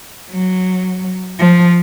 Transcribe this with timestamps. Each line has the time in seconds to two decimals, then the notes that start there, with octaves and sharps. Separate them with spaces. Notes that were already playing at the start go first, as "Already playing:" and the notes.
0.30 F#3
1.39 F3